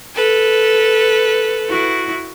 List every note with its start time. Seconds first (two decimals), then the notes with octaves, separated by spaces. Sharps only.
0.13 A4 B4
1.69 E4 F#4